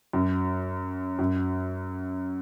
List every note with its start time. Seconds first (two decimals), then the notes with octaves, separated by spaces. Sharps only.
0.13 F#2
1.19 F#2